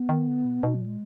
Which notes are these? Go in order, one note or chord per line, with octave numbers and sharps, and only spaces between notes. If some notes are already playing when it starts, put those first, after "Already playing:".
Already playing: B3
D#3
D3
B2
B2 D#4
F#3
A#2
G#3